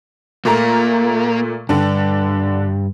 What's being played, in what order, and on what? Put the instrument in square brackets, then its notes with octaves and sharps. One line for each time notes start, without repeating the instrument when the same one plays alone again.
[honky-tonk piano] A#2 A3 A#5 [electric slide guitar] A#3
[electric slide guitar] G2 [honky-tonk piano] D3 D4